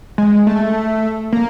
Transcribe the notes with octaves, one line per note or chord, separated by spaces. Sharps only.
G#3
A3
A#3